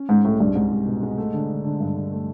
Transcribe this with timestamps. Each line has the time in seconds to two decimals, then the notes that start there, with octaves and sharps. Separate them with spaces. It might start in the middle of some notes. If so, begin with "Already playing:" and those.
Already playing: C#4
0.09 G#2 G#3
0.24 C2 A2
0.40 C2 G2
0.55 C2 G#2
0.71 C2
0.87 B2
1.03 G#3
1.18 A3
1.34 D3
1.50 D3
1.64 D3
1.80 G2
1.96 D3
2.12 A3